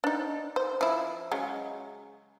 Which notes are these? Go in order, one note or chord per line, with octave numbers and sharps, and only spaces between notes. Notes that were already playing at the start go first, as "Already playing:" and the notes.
D4 D#4
C5
F3 E4
C#3 F#3 G#3